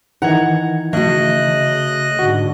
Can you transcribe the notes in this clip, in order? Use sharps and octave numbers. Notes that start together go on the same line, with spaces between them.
D#3 E3 F#5 A#5 G#6
C#3 A3 F#4 D#5 F#6
G#2 D3 F#4